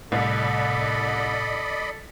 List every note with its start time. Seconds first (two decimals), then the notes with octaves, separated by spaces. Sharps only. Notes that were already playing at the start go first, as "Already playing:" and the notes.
0.12 C2 A2 C3 A4 D5 D#5 B5